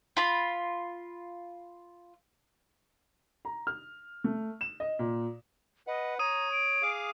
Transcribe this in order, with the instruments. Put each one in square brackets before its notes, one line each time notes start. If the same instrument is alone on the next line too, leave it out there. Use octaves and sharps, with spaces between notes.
[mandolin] F4 B5
[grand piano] A#5
F6
A3
E7
D#5
A#2
[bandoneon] B4 F#5 [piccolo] D#5
[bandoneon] C#5 [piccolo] A#5 [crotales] D#6 D#7
[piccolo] D7
[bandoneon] G#4 F5 D6